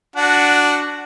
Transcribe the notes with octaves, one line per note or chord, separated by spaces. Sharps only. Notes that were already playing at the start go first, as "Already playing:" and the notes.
D4 F#4 F#5